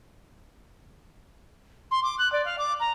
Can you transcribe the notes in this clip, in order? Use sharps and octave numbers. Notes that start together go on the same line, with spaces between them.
C6
D6
F#6
D5
F5
D6
A#5